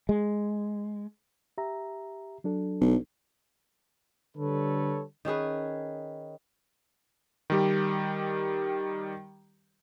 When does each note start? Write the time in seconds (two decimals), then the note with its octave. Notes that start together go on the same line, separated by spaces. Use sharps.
0.09 G#3
1.58 G4 E5 A#5
2.44 F#3 D4 A4
2.81 B1
4.37 D3 G3 A4 B4 C#5
5.25 D#3 C#4 G#4 B4
7.50 D#3 G3 G4